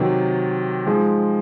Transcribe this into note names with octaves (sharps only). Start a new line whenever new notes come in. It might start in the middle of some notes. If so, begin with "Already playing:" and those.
Already playing: C3 D#3 F#3
F3 G#3 D#4